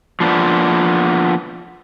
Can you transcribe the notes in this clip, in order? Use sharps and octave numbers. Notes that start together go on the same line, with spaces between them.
F3 A#3 B3 D4